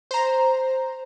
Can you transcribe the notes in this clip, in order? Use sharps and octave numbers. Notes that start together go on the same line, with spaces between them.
C5 A#5